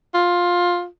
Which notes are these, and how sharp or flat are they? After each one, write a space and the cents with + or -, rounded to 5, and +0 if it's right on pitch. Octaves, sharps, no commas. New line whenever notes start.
F4 +15